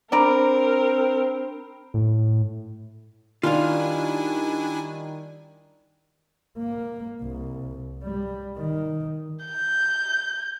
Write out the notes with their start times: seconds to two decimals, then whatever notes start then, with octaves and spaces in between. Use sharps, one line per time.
0.12 C4 D4 A#4 D5 A#5 B5 D7
1.94 A2
3.43 D#3 G3 D4 E4 F4 F5 G#5
6.58 A#3
7.22 C2
8.03 G3
8.57 D#3
9.46 G6